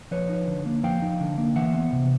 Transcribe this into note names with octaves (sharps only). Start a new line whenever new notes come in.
F3 B4 C#5
D#4
D3
A#3
F3 F5 G5
D#4
D3
A#3
E3 E5 F#5
B3
C3